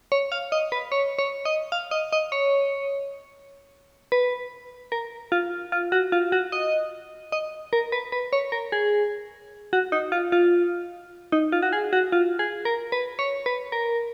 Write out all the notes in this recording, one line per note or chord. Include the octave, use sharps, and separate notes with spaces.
C#5
F5
D#5
B4
C#5
C#5
D#5
F5
D#5
D#5
C#5
B4
A#4
F4
F4
F#4
F4
F#4
D#5
D#5
A#4
B4
B4
C#5
A#4
G#4
F#4
D#4
F4
F4
D#4
F4
F#4
G#4
F#4
F4
G#4
A#4
B4
C#5
B4
A#4